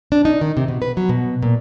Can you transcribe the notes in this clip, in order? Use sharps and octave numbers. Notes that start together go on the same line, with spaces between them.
D4
D#4
D#3
C3
B2
B4
F#3
B2
A#2